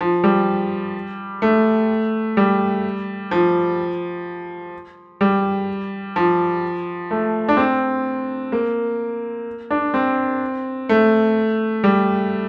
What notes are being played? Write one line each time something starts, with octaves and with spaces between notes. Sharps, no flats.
F3
G3
A3
G3
F3
G3
F3
A3
D4
C4
A#3
D4
C4
A3
G3